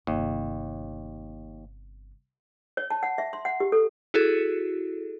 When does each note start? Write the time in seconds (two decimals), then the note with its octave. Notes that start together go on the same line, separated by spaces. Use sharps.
0.07 G1 D#2 C3
2.77 C#5
2.90 A5
3.03 F#5
3.18 E5
3.33 C6
3.45 F#5
3.60 G4
3.72 A4
4.14 E4 F#4 G#4 A4